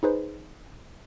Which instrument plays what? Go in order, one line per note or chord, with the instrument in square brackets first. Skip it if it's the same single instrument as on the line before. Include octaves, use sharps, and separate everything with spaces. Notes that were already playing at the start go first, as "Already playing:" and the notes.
[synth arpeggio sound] D#4 G#4 B4 C5